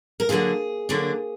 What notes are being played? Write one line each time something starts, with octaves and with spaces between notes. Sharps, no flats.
A#4
D3 F#3 A#3 D4 F4 G#4
D3 F#3 A#3 D4